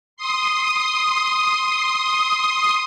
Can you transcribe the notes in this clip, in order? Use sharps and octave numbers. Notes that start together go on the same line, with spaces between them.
C6 D#6